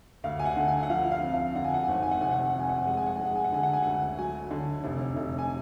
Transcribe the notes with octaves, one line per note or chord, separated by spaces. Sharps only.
D2 F5
G#5
F#5
D3
G#5
F#5
F3 F5
F5
F2
F5
D3 F#5
G#5
F#5
G#5
G#1 F#5
G#5
F#5
F1 G#5
F#5
G#5
F#5
F2
G#5
F#5
G#5
G#3 F#5
G#5
F#5
G#3 G#5
F#5
G#5
F#5
D3 G#5
F#5
G#5
D2 F#5
F#3 G#5
D3
F1
F1
G#5